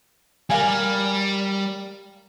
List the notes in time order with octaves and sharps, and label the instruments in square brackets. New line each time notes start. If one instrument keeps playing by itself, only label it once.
[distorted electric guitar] G3 [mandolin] A#4 F5 G#5